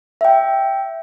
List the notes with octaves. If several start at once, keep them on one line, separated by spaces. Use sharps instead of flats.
E5 G5